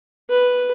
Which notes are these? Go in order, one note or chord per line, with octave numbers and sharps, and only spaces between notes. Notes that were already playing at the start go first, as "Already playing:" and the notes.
B4